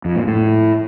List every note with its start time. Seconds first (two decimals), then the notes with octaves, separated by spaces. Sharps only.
0.05 F2
0.16 A#2
0.27 A2